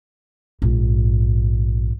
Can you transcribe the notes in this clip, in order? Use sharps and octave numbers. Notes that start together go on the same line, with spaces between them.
A#1 G#2